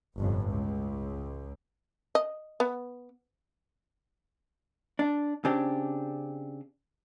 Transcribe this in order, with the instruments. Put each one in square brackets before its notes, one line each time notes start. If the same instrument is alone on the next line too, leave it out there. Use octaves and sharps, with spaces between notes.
[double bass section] G1 F2 A2
C#2
[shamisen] D#5
B3
[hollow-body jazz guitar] D4
C#3 C4 D4 G4